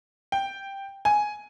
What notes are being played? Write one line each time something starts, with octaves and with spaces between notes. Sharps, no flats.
G5
G#5